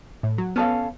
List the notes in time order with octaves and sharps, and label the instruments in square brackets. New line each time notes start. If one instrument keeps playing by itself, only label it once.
[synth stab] A2
F#3
[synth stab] B3 [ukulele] C#4 A4 F5